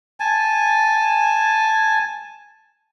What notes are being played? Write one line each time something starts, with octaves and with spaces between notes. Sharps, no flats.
G#5 A5